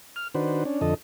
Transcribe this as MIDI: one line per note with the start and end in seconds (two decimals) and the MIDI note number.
0.16 0.28 89
0.35 0.64 51
0.35 0.64 62
0.35 0.64 66
0.35 0.64 71
0.35 0.64 72
0.65 0.81 61
0.65 0.81 62
0.81 0.94 41
0.81 0.94 50
0.81 0.94 69
0.81 0.94 75